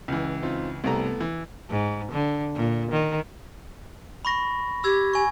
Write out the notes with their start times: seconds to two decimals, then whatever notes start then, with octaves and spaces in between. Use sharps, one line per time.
0.08 C#2 E3
0.42 C4 D#4 F4
0.84 C2 G3 A3 B3 A4 A#5
1.21 E3
1.69 G#2
2.12 D3
2.55 A#2
2.92 D#3
4.25 B5 C#6 A#6
4.84 G4 E6 G#6
5.14 G#5 C#6